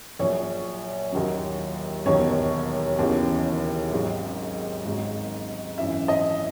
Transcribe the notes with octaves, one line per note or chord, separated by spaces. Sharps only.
A#1 A#2 F#3 C#5
D#2 D#3 F#3
E1 D#2 D#3 F#3 C#5
E1 D#2 C#3 E3
G#1 G#2 F#3
G#1 G#2 F#3
G#1 F#2 E3 E5
D#5